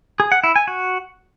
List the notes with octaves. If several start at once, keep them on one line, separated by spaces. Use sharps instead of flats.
G#4
F#5
E4
G#5
F#4